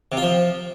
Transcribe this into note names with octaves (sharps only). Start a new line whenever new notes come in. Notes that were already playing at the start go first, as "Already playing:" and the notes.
C3
F4
F3